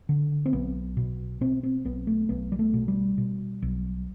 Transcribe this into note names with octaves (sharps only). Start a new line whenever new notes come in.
D3
C4
B1 B3
B2
B2 C4
C4
B1 B3
A3
B1 B3
G3
A3
B2
G3
B2
B1